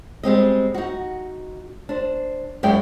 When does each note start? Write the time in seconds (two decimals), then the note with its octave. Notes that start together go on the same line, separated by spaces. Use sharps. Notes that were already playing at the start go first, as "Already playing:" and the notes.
0.23 G3 G#3 C4 D#5
0.74 D#4 F#4
1.89 D4 C5
2.63 F#2 G#3 E4 D5 G5